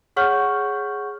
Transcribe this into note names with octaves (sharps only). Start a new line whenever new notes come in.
G#4 C#5 F#5 C#6 F6 G6